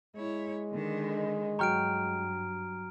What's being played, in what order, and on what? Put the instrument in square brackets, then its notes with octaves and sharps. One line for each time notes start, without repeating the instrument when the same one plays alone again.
[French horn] G#3 [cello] E4 C#5
[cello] D3 D#3
[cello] G2 [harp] F#3 G5 C#6 [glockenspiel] A#5 F6 D7